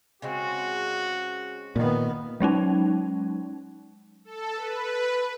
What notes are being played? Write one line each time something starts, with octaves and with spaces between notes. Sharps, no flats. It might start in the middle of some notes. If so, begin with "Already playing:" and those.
C#3 G#3 C4 F#4
A#2 D#3 B3
F#3 G#3 C#4 D#4
A4
B4